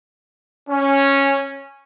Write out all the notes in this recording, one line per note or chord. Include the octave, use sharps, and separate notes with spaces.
C#4